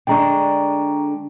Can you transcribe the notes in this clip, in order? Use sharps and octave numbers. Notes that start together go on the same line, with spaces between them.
D3 G#3 D4 G5 A#5 C#6